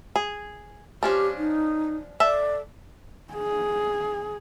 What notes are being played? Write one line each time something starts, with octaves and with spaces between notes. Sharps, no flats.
G#4
F3 C#4 D4 G4
D#4
A4 D5 E5
G#4